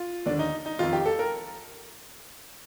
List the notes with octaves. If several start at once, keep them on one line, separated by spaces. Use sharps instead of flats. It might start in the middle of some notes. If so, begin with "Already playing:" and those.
Already playing: F4
D#2 D3 D4
D#4
D#4
F2 D#3 F4
G4
A4
A#4